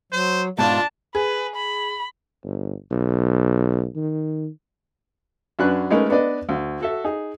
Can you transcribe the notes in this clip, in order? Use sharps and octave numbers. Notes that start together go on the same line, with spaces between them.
F#3 C5
G#2 B2 D4 F4 A5
G#4 B4
B5
G1
B1
D#3
F#2 F#3 C#4 D4 B4 F#6
G#3 A3 C#4 D#4 A#4 B4
B3 D4 B4 D5 D#5
D2
F#4 A4 E5
D#4 G#4